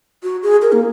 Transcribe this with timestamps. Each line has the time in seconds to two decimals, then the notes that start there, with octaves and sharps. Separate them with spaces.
0.23 F#4
0.43 G#4
0.62 A#4
0.72 A#3